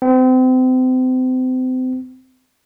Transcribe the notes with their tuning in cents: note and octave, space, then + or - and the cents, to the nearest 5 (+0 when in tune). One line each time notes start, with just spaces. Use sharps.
C4 -35